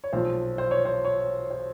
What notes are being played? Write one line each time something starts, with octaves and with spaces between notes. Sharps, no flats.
C#5
B1 A#2 F3 C5
C5
C#5
C5
C#5
C5